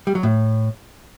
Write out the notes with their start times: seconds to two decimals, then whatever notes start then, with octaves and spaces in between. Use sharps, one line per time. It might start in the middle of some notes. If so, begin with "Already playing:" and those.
0.07 G3
0.15 F#3
0.23 A2